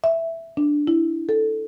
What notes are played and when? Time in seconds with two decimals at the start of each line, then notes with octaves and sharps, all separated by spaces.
0.04 E5
0.57 D4
0.87 E4
1.29 A4